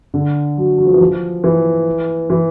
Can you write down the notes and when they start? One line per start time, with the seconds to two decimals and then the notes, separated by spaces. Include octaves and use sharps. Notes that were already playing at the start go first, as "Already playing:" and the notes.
0.14 D3
0.57 F#3
0.78 F#3
0.86 F3
0.93 E3
1.01 F3
1.44 E3
2.30 E3